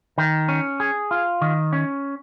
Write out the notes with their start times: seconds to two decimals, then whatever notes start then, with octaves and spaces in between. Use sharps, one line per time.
0.18 D#3
0.48 C#4
0.80 G#4
1.11 F4
1.41 D#3
1.73 C#4